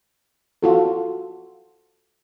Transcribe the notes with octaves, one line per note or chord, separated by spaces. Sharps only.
F4 F#4 A4